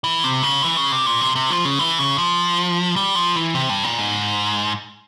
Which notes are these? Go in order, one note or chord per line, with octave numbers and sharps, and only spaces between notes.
E3
C3
C#3
E3
C#3
C3
A#2
C3
C3
F3
C#3
E3
C#3
F3
G3
F3
E3
C3
G2
A#2
G#2